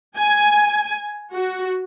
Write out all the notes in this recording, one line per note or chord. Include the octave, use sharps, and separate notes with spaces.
G#5
F#4